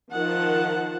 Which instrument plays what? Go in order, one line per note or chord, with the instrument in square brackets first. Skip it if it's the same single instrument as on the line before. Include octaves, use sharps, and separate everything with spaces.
[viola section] D#3 F3 F4 F#5 A5